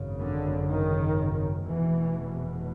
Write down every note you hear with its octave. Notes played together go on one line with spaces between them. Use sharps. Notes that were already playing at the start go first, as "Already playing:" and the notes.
Already playing: G#1 F#2 C#3
D3
D#3
F1 E2 B2 E3